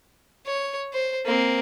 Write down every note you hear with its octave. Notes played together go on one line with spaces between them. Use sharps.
C#5
C5
A#3 C4